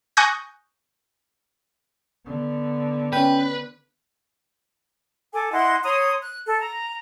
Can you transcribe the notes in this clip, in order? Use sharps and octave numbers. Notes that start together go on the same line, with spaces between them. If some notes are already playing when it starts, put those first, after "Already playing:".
G#5 C#6 D#6 F#6 G6 A#6
D3 B3
C#4 B4 G5
A4 G#5 D6
E4 D#5 F#5 C6
C#5 A#5 C6 D#6
F#6
A4
A#5